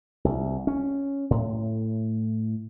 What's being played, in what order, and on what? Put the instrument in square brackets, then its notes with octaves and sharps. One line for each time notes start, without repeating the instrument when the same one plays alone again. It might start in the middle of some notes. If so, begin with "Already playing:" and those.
[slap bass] C2
C#4
A2